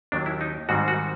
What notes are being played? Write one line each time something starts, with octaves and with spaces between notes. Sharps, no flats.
D#2 D#3 F#3 D4
E4
D#4
G#2 D#3 G3 C4 F#4
F#4